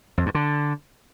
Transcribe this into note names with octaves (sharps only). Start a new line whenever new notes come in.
F2
G2
D3